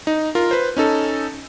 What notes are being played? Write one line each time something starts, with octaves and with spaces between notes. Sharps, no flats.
D#4
F4 A#4
B4 C5
C#4 D#4 A4